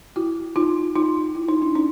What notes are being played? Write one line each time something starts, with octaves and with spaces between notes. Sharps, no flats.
E4 F#4
D#4 F4
D#4 F4
E4
D#4
D4 E4
C#4 D#4